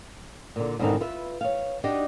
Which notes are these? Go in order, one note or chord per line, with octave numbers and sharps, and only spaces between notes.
A#2 D3
G#2 B2 D3 D#3 C4 D#4
F4 B4 E5
C#5 F5
D4 D#4 F#4 G4 D5 D#5